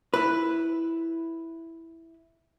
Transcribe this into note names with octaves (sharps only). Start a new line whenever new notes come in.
E4 B4